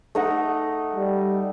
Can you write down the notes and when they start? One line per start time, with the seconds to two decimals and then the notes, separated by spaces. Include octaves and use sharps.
0.15 A3 D#4 F#5
0.96 G3